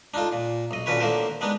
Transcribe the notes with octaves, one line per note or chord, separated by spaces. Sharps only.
D4 D#4 F4 A4
A#2
B1 D#5
A#2 D3 C#4 F#4 B4 C#5
D2 A2 D3 A#3 A#4 C5
G#3 B3 D4 D#4